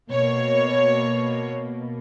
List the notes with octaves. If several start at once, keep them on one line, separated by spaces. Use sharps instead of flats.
B2 A#3 C#5